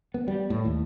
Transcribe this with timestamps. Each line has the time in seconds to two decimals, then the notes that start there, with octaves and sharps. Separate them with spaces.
0.14 B3
0.28 G3
0.50 A2
0.65 D#2